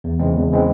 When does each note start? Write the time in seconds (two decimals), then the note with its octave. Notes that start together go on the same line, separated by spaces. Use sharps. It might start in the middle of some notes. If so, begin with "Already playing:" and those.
0.04 E2
0.19 C#3 E3 G#3 C4
0.35 E2
0.51 C#3 E3 G#3 C4